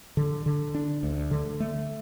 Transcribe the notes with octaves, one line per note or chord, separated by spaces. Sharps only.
D3
D3
D4
D2
D3
A3